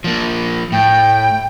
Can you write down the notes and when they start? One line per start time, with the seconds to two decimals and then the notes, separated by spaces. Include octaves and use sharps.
0.04 F3 A#3
0.72 A2 G5